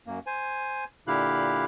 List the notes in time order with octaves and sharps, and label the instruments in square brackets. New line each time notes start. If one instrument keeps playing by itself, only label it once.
[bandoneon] F#2 A#3
C5 G#5
A#2 D3 E4 G4 F5 F#6